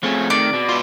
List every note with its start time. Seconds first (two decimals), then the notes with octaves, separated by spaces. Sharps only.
0.03 F3 A3 C4 C#4 G#4 G#6
0.30 D#3 D5
0.53 B2
0.69 F4 B4 C6